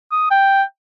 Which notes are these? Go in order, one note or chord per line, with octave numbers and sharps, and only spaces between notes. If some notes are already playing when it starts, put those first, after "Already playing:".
D#6
G5